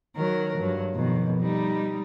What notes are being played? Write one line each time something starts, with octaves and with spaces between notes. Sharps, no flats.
D#3 F#3 A#4
G2 F#3
F2 B2 D#3
G3 D#4